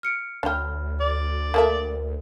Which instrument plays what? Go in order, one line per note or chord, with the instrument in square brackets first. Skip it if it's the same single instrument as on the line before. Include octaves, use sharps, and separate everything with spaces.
[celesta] F6 C#7 D7
[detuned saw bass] D2 [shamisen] D4 G5 [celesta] C#5 B5 F6
[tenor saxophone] D5
[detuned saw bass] D2 [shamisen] A#3 A4 E5 [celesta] A#4